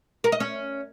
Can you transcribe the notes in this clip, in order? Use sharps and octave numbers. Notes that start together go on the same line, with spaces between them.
A#4
D#5
C#4